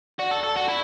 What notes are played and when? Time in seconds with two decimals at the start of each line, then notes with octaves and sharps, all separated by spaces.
0.19 F#4 D5
0.31 A4
0.43 A4
0.56 F#4
0.68 E4 E5